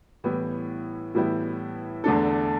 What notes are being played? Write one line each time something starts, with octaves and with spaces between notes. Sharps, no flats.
A2 E3 G3 B3 E4
A2 E3 G3 B3 E4
E2 D3 A3 D4 A4